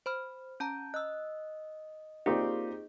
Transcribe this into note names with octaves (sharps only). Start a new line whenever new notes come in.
C5 B5 F6
C#4 A5 A#5 G6
D#5 E6 F#6
A#3 C4 D#4 F4 G4 G#4 D5